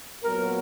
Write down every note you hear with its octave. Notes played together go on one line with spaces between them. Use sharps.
A#2 F#3 B3 A#4